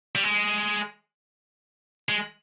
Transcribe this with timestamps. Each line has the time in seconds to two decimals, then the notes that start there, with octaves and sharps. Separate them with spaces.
0.15 G3
0.24 G#3
2.09 G#3